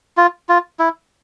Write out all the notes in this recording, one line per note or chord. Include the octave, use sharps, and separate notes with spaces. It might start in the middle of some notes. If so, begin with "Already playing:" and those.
F4
F4
E4